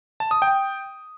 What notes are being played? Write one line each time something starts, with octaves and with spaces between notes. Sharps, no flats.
A5
D#6
G5